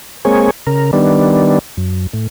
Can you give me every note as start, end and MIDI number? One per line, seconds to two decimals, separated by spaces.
0.25 0.50 56
0.25 0.50 58
0.25 0.50 60
0.25 0.50 68
0.25 0.50 73
0.67 0.91 49
0.67 0.91 70
0.93 1.59 51
0.93 1.59 55
0.93 1.59 59
0.93 1.59 62
1.77 2.07 42
2.14 2.27 45